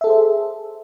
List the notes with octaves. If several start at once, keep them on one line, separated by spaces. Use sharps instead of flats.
G#4 A4 C5 E5